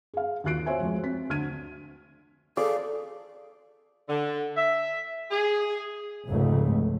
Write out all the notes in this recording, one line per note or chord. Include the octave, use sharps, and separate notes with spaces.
G#4 F5
D#2 F4 F#4 F#6 C7 D7
F#4 C5 C#5 E5 G#5
F2 G#3
C4 B6
D2 D3 F6 G#6 D#7
G#4 A4 D5 F5
D3
E5
G#4
F1 C#2 G#2 A3